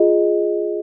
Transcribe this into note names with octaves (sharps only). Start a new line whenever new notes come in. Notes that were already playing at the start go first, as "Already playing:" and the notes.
Already playing: F4 G#4 D#5